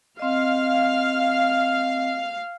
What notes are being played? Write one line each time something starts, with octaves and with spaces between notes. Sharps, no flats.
C4 D#5 F5